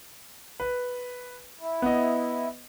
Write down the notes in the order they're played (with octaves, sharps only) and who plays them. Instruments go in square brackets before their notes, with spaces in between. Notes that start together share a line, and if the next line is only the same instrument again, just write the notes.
[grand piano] B4
[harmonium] E4
[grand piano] B3 D#5